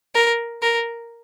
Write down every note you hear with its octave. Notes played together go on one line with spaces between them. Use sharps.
A#4
A#4